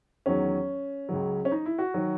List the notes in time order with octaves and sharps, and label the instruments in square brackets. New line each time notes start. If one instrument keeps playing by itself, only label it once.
[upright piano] E2 D#3 F#3 C#4
C#2 C#3 F#3
C#4
D#4
E4
F#4
D#3 F#3